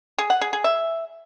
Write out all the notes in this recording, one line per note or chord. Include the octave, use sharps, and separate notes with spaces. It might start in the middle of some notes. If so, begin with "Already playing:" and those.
G#4
F#5
G#4
G#4
E5